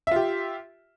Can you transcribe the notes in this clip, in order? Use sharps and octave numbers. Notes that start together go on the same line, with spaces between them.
F4 G4 E5